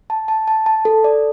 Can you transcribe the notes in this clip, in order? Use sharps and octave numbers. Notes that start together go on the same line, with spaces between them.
A5
A5
A5
A5
A4
D5